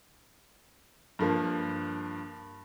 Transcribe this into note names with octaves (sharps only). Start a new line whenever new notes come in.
G2 F3 A#3